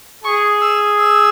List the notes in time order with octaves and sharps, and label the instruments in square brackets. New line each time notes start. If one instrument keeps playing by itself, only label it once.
[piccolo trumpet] G#4 [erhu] C#6
[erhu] E6
E6